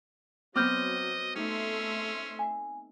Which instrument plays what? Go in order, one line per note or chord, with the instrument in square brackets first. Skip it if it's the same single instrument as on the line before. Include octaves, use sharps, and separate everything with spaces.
[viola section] F#3 [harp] B3 C4 [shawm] D#5 [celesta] D6 F6 G6
[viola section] A3 E5 C6 [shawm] C#4 [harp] D#4
[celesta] G#5